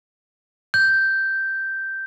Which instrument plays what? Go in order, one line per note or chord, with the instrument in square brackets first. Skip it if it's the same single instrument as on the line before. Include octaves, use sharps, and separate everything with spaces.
[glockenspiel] G6